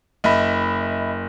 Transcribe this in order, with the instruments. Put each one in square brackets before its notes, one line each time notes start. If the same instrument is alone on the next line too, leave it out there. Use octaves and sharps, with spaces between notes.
[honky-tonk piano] F#1 [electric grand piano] D#5 E5 B5